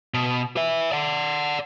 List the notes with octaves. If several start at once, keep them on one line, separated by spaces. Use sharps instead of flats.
B2
B4 E5
D5 F#5